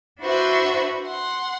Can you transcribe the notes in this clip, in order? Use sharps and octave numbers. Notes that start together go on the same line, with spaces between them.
D4 E4 F#4 B4 C5 E5
F#5 C6